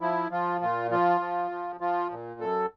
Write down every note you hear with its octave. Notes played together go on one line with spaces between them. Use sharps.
F3 E4
F3 F4
A#2 F4
F3 F4
F3
F3
F3 F4
A#2
F#2 A4